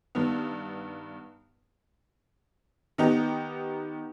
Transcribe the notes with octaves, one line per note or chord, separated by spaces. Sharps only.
G2 D#3 B3
D#3 B3 D#4 G4